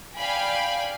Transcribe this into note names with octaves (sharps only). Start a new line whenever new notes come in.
D5 F5 G5 G#5 B5